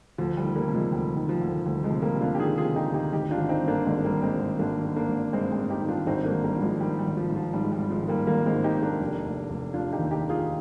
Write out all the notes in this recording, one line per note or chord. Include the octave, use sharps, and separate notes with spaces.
D2 F3
G3
D#3
G3 A#3
C3
F3 G#3
D2 G3
D#3
F3
D2
D2 G3
F3 G#3
C3
G3 A#3
C3
D4 F4
G4
D#3 F4 G#4
F4 G#4
C3
D#4 G4
D2
D#4 G4
G#1 D#4 G4
D4 F4
G#1
C4 D#4
G2
A#3 D4
G#1 G#3 C4
G3 A#3
G#1
G#3 C4
G#1
G#1 A#3 D4
D#3
A#3 D4
G#1
G2 G#3 C4
G#3 C4
G2
D#4 G4
D#3
D4 F4
G#1 C4 D#4
A#3 D4
G#1
G3 A#3
G#1
F3 G#3
D#3 G3
G3
G#1
F3
G#2
F3
G#2 G3
G#3
G3
G#1
F3 G#3
D#3
G3 A#3
G#1 G3 A#3
G#3 C4
G#2
D#4 G4
G#2
A#3 D4
F1
F1
F1
F1 D4 F4
D#4 G4
D#2
D#4 G4
D#3
F4 G#4